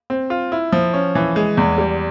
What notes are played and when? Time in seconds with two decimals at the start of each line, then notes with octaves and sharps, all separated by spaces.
0.10 C4
0.30 F4
0.52 E4
0.73 F3
0.93 C#4
1.15 E3
1.36 G#3
1.57 E2
1.78 G3